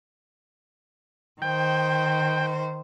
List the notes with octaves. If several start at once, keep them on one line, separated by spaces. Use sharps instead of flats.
D#3 C5 G5